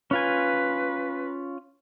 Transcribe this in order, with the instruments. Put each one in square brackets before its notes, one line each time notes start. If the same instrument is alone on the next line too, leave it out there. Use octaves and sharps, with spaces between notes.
[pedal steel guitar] C#4 F4 G#5 [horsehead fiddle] B4